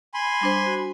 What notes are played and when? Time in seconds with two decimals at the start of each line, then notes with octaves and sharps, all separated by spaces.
0.14 G#5 B5 C6
0.41 G3 D4 C5
0.66 F#4